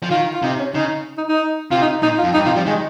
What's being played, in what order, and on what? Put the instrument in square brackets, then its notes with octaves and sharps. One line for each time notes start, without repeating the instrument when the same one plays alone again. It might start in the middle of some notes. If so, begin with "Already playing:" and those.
[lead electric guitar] F3
[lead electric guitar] D#3 [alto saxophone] F4
[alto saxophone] F4
[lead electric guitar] C3 [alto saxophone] D#4
[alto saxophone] C#4
[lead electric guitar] C#3 [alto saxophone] D#4
[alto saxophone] D#4
D#4
[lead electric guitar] C3 [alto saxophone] F4
[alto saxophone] D#4
[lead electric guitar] A#2 [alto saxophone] D#4
[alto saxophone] F4
[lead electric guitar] F2
[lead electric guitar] G2 [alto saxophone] D#4
[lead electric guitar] C3 [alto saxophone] F4
[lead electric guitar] F3 [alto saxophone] G3
[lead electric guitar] D#3 [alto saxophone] G#3